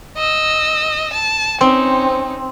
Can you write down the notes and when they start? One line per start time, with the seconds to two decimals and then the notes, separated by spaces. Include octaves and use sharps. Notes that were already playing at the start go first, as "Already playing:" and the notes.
0.17 D#5 E6
1.13 A5
1.61 C4 C#4 D#4